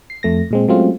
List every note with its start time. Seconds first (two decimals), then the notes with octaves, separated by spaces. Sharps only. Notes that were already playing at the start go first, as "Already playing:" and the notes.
0.10 C7
0.23 F2 A3 A#6
0.51 A#2 G#3 C4
0.68 F#3 G#3 A3 C4 C#4 F4